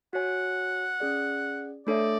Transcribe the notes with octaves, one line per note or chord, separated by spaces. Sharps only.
F#4 C#5 F#5 G#5
C#4 G#4 D5
A3 D4 A4 C#5 D5 E5